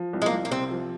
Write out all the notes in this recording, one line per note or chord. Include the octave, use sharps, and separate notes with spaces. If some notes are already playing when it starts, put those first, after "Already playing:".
Already playing: F3
C2
G#3
A#3
C2
A#3
C3 C4
F3